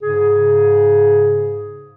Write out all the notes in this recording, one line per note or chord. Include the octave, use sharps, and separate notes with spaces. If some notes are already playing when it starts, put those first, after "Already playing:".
G#2 C#3 G#4